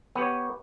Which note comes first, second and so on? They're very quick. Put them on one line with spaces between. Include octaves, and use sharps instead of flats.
B3 G4 C#5